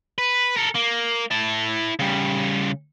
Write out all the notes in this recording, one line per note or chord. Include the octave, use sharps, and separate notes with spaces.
B4
A4 A#4
A#3
E4 A5
C#3 G3